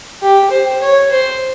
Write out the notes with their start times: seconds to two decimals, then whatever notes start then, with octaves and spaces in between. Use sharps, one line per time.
0.22 G4
0.51 C5
0.82 C#5
1.11 C5